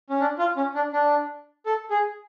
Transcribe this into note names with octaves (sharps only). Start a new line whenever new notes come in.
C#4
D4
F4
C#4
D4
D4
A4
G#4